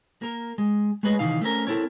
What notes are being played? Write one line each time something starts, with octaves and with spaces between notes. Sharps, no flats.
A#3 A#4
G#3
G#3 A3 G#4 B4 C#5 D#5
C3 D#3 E3 D#4 F5
A3 C4 C#4 A#4
C4 E4 A4 A#4 C#5